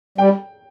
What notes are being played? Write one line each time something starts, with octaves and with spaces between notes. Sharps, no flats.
G3 G5